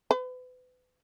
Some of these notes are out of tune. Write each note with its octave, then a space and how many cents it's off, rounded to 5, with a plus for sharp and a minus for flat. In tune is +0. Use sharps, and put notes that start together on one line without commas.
B4 +35